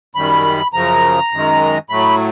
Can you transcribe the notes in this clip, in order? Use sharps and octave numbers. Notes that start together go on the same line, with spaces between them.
F#2 D#3 G3 B5
F#2 C#3 F3 A#5
F#2 D#3 G#3
A2 F#3 A3 B5